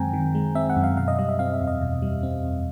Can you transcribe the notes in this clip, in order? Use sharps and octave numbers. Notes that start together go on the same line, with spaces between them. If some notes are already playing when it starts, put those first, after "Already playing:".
Already playing: F#2 D#3 G#3 C4 G5 G#5 A#5
D#3
G#3
C4 E5
F#5
F#2
F5
B2 F5
D#5
G3 D#5
E5
C4 F5
E5
E2
D#5
B2
G3
C4
E2